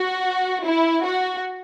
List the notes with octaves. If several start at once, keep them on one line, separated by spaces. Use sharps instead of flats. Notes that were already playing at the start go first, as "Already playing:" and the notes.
Already playing: F#4
E4
F#4